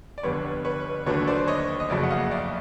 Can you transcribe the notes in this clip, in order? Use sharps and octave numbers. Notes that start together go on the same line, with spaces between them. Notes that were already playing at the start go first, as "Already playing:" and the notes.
D5
G1 F2 D3 G3 B3 B4 C#5
B4 C#5
D#2 D3 F#3 A3 D4 B4 C#5
C5 D5
C#5 D#5
D#5
F#1 F2 C#3 F#3 A3 D5 E5
F#5
D#5 F5
D5 E5